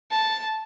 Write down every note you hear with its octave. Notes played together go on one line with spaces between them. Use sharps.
A5